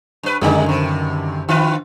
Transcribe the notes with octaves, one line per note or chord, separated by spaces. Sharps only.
G2 B4
F#2 D3 D#3 G3 D4 D#4
G2 C3
D3 F4 B4